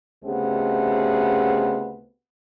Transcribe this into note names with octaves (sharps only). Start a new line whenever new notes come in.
D2 C#3 A3 B3 C4 G4